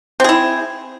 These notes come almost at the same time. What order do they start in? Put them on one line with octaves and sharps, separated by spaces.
C4 G#4 E4